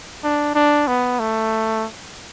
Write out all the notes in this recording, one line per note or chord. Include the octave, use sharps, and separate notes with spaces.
D4
D4
B3
A3